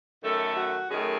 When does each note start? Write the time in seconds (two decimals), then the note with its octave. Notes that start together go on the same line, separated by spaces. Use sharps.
0.23 F#2 D#3 A3 A4
0.56 F#4
0.89 F#2 D#3 A3 G#4